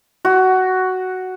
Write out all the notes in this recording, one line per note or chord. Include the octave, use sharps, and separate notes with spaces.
F#4